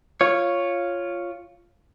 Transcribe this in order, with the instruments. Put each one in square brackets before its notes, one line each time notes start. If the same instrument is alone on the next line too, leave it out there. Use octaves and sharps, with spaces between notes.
[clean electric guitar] F4 C#5